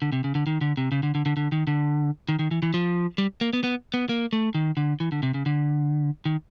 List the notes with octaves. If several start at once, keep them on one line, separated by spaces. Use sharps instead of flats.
D3
C3
C#3
D3
D#3
D3
C3
C#3
D3
D3
D3
D3
D#3
D3
D#3
D#3
E3
E3
F3
G3
A#3
B3
B3
B3
A#3
A3
D#3
D3
E3
D3
C3
C#3
D3
D#3